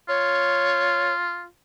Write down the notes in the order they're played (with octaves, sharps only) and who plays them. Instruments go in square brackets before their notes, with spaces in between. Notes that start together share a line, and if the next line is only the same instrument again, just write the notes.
[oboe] F4 [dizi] C#5